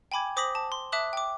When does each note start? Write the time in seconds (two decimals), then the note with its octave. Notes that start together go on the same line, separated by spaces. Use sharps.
0.12 G5 G#5 B5 D6 G#6
0.37 C5 D6 D#6 A#6 B6 F#7
0.55 A5
0.72 C6
0.92 E5 A5 D6 D#6 F#6 F#7
1.13 G5 D6